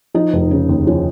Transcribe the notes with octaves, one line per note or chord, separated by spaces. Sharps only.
F3 D#4
F1
C#3
D#2
F3 C#4